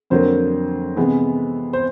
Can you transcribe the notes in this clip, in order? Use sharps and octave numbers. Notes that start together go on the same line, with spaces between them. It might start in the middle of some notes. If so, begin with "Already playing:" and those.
F2 D3 F#3 A#3 C5
C3 E3 G#3 B3
C5